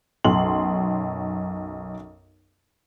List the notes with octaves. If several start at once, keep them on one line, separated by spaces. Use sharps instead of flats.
B1 F#2 C6 F#7